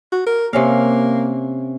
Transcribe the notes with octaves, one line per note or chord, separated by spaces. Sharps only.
F#4
A#4
C3 A#3 C#4 F5